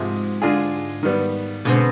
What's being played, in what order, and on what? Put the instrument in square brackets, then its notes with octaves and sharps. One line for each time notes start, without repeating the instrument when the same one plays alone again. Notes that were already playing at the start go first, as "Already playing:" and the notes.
Already playing: [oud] G#2 [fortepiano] C3 F3 G#3
[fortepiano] D3 G#3 D4 F4 G#4
D#3 G3 B3
[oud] B2 [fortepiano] D3 G#3 C4